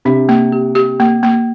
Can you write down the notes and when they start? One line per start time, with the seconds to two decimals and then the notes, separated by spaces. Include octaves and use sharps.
0.05 C3 D4
0.29 A#3
0.52 G4
0.75 G4
1.00 A#3
1.23 A#3